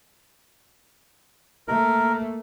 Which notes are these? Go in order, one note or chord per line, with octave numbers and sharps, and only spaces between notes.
A3 A#3 A#4